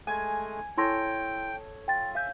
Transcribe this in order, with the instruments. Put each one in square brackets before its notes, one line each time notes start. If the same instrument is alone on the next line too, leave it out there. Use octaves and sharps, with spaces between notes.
[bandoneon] G#3 A3 [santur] G#5
[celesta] E4 C6 A#6 [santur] A4 C#5 [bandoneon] G5
[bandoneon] F4 [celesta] G5 A6
[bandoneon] E5 G#5 [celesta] F5 G6